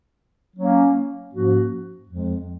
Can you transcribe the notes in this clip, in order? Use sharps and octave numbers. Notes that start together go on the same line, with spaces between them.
F#3 A#3 C#4
G#2 F3 A#3 C#4 F#4
F2 F3 G#3